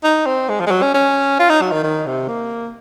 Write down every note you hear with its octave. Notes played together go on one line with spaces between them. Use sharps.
D#4
C4
G#3
F3
G#3
F#3
C#4
C#4
F4
D#4
F#3
D#3
D#3
C3
A#3